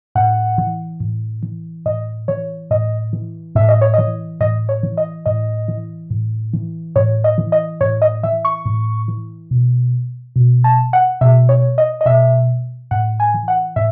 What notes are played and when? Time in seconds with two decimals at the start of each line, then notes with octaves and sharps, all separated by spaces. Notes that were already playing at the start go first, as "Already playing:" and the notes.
0.15 A2 F#5
0.58 E3
1.00 A2
1.43 E3
1.86 A2 D#5
2.28 E3 C#5
2.71 A2 D#5
3.13 E3
3.55 A2 E5
3.69 D#5
3.81 C#5
3.94 E3 D#5
4.40 A2 D#5
4.69 C#5
4.83 E3
4.98 D#5
5.26 A2 D#5
5.68 E3
6.10 A2
6.53 E3
6.96 A2 C#5
7.24 D#5
7.38 E3
7.52 D#5
7.81 A2 C#5
8.02 D#5
8.23 E3 E5
8.45 C#6
8.66 A2
9.08 E3
9.51 B2
10.36 B2
10.64 A5
10.93 F#5
11.21 B2 E5
11.49 C#5
11.78 D#5
12.01 D#5
12.06 B2 E5
12.91 A2 F#5
13.20 G#5
13.34 E3
13.48 F#5
13.76 A2 E5